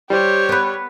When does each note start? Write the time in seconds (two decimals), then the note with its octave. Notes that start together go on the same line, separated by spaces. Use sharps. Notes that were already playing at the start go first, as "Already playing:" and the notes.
0.10 G3 G4 C5 C#5
0.49 B3 B4